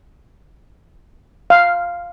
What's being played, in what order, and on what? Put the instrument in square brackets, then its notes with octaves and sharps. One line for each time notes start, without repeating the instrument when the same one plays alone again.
[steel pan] F5